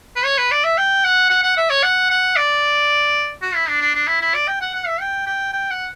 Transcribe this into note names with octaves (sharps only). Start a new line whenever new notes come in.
B4
C#5
B4
D5
E5
G5
F#5
F#5
F#5
E5
C#5
F#5
F#5
D5
F#4
E4
D4
D4
D4
E4
E4
D5
G5
F#5
F#5
E5
G5
G5
G5
F#5